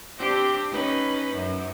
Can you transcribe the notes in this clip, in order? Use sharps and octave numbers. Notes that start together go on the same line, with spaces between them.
C4 D4 G4
C#4 D#4 B4
F#2